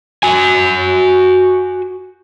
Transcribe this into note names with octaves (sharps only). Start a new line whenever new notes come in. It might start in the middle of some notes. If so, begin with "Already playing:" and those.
F#4 G#5